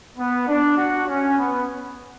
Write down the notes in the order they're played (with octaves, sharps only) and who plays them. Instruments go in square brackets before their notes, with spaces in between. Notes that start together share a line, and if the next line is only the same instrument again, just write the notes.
[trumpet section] B3
D4
F#4
C#4
B3